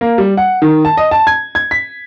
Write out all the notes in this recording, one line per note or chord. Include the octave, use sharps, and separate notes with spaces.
A#3
G3
F#5
D#3
A5
D#5
A5
G#6
G#6
B6